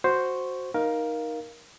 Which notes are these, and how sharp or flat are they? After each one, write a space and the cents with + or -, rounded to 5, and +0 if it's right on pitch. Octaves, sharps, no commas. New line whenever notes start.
F#4 +0 C5 +0 C#6 +0
D#4 +0 A#4 +15 F5 +0